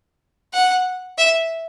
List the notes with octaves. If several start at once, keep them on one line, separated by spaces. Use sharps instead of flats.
F#5
E5